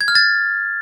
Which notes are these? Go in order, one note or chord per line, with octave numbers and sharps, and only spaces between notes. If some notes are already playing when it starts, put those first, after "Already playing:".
G#6
F6
A6